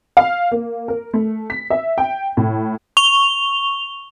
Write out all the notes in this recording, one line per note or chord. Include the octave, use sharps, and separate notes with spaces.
F5
A#3
A#4
A3
B6
E5
G5
A2
C#6 F7 G7